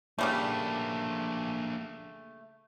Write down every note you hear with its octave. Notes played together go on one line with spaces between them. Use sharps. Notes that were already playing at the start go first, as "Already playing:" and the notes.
C#3 G3 A3 A#3 D4